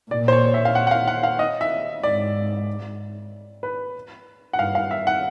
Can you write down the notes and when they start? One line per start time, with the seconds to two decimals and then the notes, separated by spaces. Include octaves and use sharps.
0.11 A#2 D5
0.28 C5
0.32 C#5
0.54 E5
0.65 F5
0.75 F#5
0.87 F#5
0.91 F5
1.07 F#5
1.23 F5
1.39 D#5
1.61 E5
2.03 G#2 D5
3.63 B4
4.53 F#5
4.58 G2 F5
4.75 F5
4.91 E5
5.07 F#5